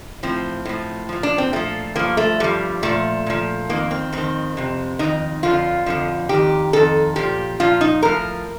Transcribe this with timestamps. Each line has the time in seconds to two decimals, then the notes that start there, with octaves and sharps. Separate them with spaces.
0.23 A2 F3 C4
0.65 A2 F3
1.09 A#2 F3
1.23 D4
1.38 C4
1.53 A#2 F3 A3
1.96 G2 F3 A#3
2.17 A3
2.40 G2 F3 G3
2.83 A#2 F3 A3
3.26 A#2 F3
3.69 F2 D#3 A#3
3.91 C4
4.12 F2 D#3 C4
4.57 F2 C3
4.99 F2 C3 D#3 D#4
5.43 F2 D3 F3 F4
5.86 F2 D3 F3
6.29 D#3 G4
6.34 F2
6.73 F2 D#3 A4
7.16 A#2 F3 G4
7.60 A#2 F3 F4
7.81 D#4
8.02 A2 F3 A#4